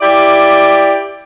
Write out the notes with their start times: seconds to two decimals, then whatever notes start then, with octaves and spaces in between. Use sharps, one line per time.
0.01 E4 G4 D5